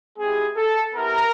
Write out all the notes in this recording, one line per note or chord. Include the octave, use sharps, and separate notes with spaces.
G#3 C4 E4 G4 G#4
A4
B3 E4 G4 A#4